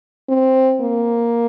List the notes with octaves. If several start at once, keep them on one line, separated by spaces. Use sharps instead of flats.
C4
A#3